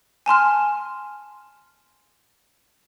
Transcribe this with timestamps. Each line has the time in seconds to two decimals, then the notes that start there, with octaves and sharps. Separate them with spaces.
0.26 G#5 A5 C6 F6